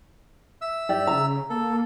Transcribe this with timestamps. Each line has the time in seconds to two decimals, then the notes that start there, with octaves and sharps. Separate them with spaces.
0.61 E5 E6
0.89 G2 G4 D5
1.07 C#3 A#5
1.50 A#3 A4